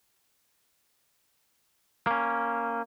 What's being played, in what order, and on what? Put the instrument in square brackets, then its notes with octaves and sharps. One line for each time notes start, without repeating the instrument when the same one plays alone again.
[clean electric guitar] A#3 C#4